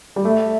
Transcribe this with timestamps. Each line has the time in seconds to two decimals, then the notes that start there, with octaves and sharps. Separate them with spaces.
0.16 G3
0.25 A3 E5